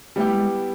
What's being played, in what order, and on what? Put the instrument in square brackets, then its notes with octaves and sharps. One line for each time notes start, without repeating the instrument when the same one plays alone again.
[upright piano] G3 B3 E4 G4 [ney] A3
[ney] G#3